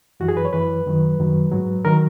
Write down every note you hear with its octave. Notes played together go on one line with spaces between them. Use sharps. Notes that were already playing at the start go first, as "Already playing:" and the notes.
F#2 E3 F#4
G#4
B4
C#5
F#2 E3 B4
F#2 D#3 F#3
F#2 D#3 F#3
G#2 F#3
D#3 F#3 A#4